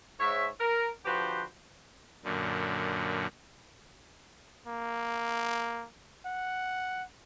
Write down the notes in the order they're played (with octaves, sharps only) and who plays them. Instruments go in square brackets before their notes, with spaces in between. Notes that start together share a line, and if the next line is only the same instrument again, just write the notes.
[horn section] G#2 C#5 E5
A#4
D3 F3 F#4 G4 B4 C5
[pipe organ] F#2 A#2 D3
[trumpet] A#3
F#5